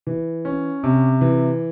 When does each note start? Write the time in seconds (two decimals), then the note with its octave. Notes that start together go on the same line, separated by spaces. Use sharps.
0.07 E3
0.45 C#4
0.83 C3
1.21 E3